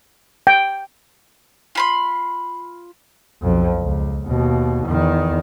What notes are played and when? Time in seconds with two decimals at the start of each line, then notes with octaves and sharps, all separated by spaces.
0.47 G5
1.75 F4 B5 C6
3.43 B1 F2
3.80 C#2
4.27 D#2 B2
4.86 E2 D#3